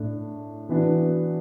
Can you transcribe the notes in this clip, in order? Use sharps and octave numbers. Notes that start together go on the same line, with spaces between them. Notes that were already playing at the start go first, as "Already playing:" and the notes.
Already playing: A2 A3 D4
E3 B3 D4 F#4